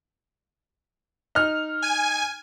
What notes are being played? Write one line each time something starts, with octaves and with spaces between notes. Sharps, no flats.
D#4 F6
G#5